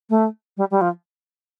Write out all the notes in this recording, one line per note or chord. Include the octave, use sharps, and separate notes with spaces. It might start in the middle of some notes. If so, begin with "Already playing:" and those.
A3
G3
G3
F3